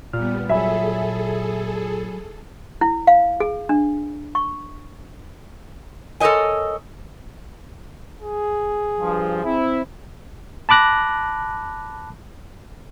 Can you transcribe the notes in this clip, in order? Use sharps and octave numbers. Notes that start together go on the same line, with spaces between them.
A#2 G3 B3 F6
F#3 G#4 A4 E5 G#5 B5
E4
F5
G#4
D4
C#6
A4 A#4 C5 C#5 D#5 G#5
G#4
G2 F3
C4 E4
A5 B5 D6 F#6 A#6